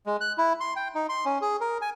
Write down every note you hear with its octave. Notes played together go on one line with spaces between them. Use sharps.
G#3
F#6
E4
C6
G5
D#4
C6
C#4
G#4
A#4
G#5